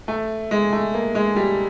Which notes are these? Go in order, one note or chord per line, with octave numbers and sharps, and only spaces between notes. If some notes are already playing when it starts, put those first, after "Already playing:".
A3
G#3
A3
A#3
G#3
G3